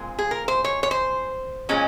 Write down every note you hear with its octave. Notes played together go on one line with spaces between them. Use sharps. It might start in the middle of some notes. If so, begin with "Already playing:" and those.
Already playing: A#2 G#3 C4
G#4
A#4
C5
C#5
C#5
C5
A#2 G#3 C#4